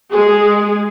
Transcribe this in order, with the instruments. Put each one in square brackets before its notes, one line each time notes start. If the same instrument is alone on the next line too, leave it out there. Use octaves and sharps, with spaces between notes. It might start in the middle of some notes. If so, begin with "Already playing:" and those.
[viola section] G#3 G#4